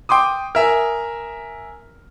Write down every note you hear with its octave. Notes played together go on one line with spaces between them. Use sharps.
G5 C6 D6 D#6
A#4 E5 G#5